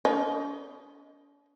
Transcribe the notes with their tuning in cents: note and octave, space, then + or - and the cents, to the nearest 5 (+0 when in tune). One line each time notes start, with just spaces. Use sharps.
D4 -45 D#5 +5